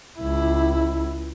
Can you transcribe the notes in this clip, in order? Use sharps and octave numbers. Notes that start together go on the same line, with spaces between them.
C#2 E4